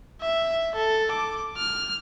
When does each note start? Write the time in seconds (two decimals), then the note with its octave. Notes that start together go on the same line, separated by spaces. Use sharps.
0.21 E5
0.75 A4
1.11 D6
1.57 F6